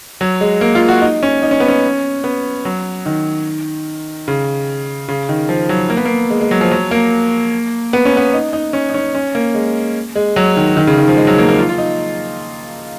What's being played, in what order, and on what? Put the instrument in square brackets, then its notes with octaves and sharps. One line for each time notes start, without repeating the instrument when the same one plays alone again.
[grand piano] F#3
G#3
A#3
F4
F#4
D#4
C#4
D#4
C#4
B3
C#4
B3
F#3
D#3
C#3
C#3
D#3
F3
F#3
A#3
B3
A#3
G#3
G#3
F#3
F3
F#3
A#3
B3
C#4
B3
D#4
D#4
C#4
D#4
C#4
C#4
A#3
G#3
G#3
F#3
D#3
D#3
C#3
D#3
F3
G#3
F#3
A#3
A#3
F4
F4
D#4